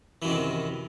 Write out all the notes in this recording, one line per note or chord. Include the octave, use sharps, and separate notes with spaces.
F#2 C3 D#3 E3